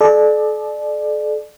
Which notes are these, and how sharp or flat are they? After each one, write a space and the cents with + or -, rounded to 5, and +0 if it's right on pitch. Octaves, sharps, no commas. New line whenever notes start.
A4 -40 D5 +25